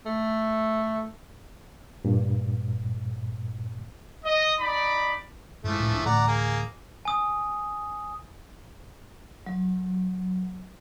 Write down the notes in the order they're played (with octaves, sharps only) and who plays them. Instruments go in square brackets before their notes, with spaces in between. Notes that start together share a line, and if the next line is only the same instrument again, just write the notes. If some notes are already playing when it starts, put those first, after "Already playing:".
[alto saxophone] A3
[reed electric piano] G2 A#2
[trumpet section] D#5
D#4 D5 B5
[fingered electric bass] G2 G#3 [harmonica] E3 F3 A3
[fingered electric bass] C2 A2
C#2 D4
[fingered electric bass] D2 A2 E3 [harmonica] D5 F#5 A#5
[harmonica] A#3 G#4
[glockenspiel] G#5 D#6
[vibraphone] F#3